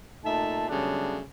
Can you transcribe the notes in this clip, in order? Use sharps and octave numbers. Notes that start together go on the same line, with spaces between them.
A#2 A3 D#4 E5 A5
C#3 F#3 G3 A3 B3 D4